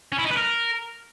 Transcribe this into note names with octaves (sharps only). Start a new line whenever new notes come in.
C#4
E4
D#4
B4
A#4